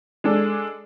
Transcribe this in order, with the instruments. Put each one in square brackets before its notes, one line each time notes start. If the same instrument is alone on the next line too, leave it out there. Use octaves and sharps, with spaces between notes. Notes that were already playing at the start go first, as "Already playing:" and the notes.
[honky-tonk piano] G#3 D4 A4